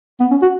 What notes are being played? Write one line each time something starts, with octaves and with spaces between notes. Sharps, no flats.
B3
C#4
F#4